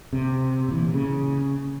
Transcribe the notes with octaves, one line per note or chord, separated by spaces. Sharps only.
C3
A#2 E3
C#3